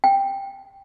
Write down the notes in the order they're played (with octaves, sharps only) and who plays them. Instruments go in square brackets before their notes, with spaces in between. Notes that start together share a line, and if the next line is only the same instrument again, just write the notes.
[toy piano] G5